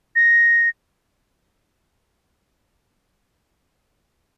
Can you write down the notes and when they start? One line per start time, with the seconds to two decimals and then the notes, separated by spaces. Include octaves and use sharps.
0.16 A#6